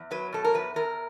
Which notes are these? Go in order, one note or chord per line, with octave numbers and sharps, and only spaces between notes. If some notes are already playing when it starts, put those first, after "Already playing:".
Already playing: E2
F#3 B4
B2 A4
A#4
E2 B4
E2 A#4